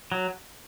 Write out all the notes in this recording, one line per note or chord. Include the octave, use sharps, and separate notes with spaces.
F#3